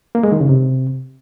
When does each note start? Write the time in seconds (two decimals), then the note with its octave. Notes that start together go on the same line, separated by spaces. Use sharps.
0.15 A#3
0.23 G#3
0.32 D#3
0.41 C#3
0.49 C3